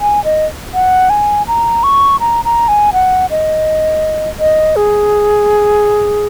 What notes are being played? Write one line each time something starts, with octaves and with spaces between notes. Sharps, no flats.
G#5
D#5
F#5
G#5
A#5
C#6
A#5
A#5
G#5
F#5
D#5
D#5
G#4